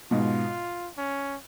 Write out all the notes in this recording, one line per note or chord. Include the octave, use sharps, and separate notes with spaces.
G#2 B2 F4
C#4